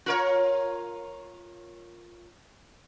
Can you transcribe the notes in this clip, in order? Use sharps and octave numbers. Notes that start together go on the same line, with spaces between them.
F4 A#4 C#5